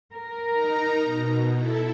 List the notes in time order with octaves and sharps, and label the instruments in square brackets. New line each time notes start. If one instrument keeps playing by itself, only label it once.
[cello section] A#4
[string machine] D#4 A#5
B2
E4 A4